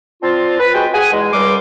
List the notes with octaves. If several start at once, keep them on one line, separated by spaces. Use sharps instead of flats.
C4 D4 F4
B4
G#3 C#4 F#4 G5
G#4 F#5 G#5
E2 G#3
C#2 F#2 G3 C6 D6